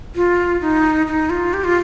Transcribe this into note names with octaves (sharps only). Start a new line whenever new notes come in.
F4
D#4
D#4
F4
G4
F4